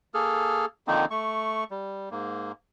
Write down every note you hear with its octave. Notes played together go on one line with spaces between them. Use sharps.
A#3 G#4 A4 F6
D3 D#3 F3 A#3 C4 D#4
A3 C#6
G3
G#2 A#3